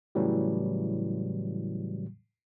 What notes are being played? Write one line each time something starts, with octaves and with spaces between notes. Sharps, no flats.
A2 C#3 E3 F#3 G3